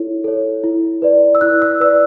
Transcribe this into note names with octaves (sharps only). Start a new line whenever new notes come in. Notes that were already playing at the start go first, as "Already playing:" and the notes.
Already playing: E4 A4 C#5
A4 C#5
E4
B4 D5
E6
E4 F#6
E6
B4 D5 E6